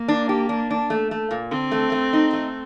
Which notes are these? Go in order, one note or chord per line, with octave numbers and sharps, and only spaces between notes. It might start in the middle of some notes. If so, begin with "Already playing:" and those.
Already playing: A#3
D4
G4
D4
D4
A3
A3
A#2
D3 C4
A3
A3
D#4
A3